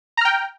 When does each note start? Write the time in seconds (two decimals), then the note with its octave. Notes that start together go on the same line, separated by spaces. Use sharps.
0.17 A#5
0.21 F6
0.25 G5